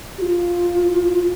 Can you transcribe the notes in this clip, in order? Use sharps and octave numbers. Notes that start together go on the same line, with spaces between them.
G4
F4